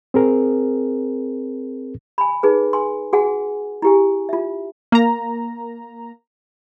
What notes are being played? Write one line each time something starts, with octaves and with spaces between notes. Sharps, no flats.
C4 G#4 A#4
G#5 B5
D#4 G#4 B4
G#5 C6
F#4 G#4 F#5 G#5
E4 G4 G#5
F4 E5
A#3 A#5